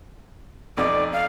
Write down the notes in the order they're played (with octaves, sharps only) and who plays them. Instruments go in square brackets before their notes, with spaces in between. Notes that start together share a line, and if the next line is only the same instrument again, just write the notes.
[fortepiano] B1 F2 D#4 [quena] D5
[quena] F5